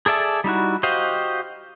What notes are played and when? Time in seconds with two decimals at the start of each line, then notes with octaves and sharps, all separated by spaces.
0.06 G#4 A4 D5 E5 A5
0.44 G3 D#4 E4 F#4
0.83 F#4 G4 C5 D#5 F5